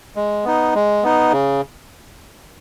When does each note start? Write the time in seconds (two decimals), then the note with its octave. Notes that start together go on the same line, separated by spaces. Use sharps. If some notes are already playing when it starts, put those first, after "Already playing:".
0.16 G#3
0.45 B3 D#4
0.75 G#3
1.03 B3 D#4
1.32 C#3